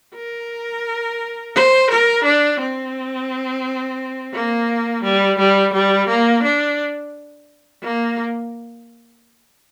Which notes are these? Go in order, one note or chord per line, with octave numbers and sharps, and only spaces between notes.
A#4
C5
A#4
D4
C4
A#3
G3
G3
G3
A#3
D4
A#3